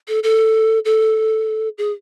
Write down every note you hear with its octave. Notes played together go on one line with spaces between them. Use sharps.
A4
A4
A4
G#4